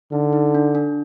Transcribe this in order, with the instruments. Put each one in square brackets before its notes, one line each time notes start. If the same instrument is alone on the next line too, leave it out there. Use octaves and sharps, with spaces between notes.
[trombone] D3 [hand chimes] D#4
[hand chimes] D#4
D4
D4